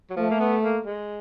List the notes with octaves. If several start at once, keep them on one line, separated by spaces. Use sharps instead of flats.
F#3
F3 A3
A#3
B3
A#3
G#3